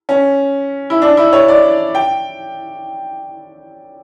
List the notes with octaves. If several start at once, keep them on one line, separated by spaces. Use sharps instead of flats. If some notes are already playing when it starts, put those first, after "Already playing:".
C#4
E4
D4
E4
C#5
D5
G5